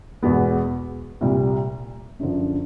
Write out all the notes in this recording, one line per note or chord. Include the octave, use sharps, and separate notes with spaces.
E2 B2 G#3 B3
C2 A#2 G3
F#2 D3 F3